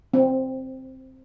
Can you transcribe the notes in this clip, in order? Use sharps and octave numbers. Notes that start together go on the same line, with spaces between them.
C4